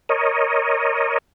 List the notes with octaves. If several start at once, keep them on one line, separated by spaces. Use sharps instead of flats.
A#4 C#5 D#5